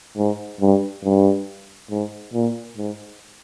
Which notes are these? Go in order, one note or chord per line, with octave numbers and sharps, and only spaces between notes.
G#2
G2
G2
G#2
A#2
G#2